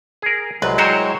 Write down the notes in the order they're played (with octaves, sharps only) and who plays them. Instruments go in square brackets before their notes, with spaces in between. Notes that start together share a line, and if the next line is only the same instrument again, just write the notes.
[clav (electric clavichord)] G#4 A#4
[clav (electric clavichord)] C2 [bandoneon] F#3 G#3 [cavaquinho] B4
[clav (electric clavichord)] E4 F#4 C5 [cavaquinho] A#4 C#5 G5